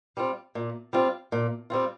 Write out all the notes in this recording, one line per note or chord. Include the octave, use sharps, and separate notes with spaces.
G3 C4 F4
A#2
G3 C4 F4
A#2
G3 C4 F4